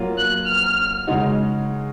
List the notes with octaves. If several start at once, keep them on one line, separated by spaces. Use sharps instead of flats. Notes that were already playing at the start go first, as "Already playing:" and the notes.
Already playing: F#3 A#3 F4
F#6
F6
C#3 G#3 D#4 F#4